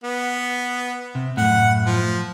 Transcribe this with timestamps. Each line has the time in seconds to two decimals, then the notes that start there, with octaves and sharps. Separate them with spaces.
0.04 B3
1.15 C3
1.37 F#2 A2 F#5
1.86 F3